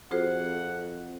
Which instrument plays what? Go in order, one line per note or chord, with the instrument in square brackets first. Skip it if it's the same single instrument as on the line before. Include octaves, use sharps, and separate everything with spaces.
[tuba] F2 [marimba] F4 G#4 C5 [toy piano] F#4 A4 [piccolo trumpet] F#5